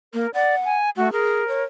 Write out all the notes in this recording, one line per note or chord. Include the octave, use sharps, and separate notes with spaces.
A#3 A#4
D5 F#5
G#5
A3 F#4
G#4 A#4
C#5